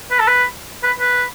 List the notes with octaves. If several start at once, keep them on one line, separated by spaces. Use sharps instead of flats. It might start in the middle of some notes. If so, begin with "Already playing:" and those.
B4
A4
B4
B4
B4